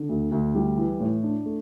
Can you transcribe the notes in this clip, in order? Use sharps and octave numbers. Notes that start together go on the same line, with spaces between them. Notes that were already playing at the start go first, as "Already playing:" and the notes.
Already playing: D3
D2
D2
G3
E3
A2
D4
A3